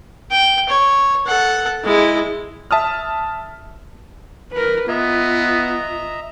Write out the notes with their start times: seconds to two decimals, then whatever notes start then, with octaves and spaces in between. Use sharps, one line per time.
0.31 G5
0.69 C#5
1.27 A4 F#5
1.84 G#3 E4
2.71 E5 A5 D#6 F6
4.53 A#4 B4
4.89 B3 F4 D#5 E5 A#5